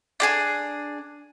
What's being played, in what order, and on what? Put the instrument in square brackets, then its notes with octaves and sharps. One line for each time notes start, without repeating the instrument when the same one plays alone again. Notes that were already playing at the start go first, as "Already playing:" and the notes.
[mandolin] D4 G4 G#4